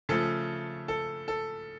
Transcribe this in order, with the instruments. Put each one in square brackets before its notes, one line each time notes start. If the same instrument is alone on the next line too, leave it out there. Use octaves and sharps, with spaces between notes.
[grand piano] C#3 F3 A3 A4
A4
A4